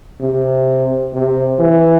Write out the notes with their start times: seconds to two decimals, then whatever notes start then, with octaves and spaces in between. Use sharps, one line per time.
0.21 C3
1.13 C3
1.59 E3